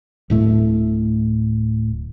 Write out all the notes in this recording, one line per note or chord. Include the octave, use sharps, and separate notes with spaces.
D1 A2 A3